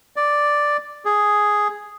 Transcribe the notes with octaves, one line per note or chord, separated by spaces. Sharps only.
D5
G#4